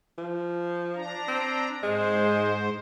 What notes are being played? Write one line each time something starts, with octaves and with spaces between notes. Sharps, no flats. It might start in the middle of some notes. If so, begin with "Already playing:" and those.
F3
D4 A#5
C4
G#2 G#3 C5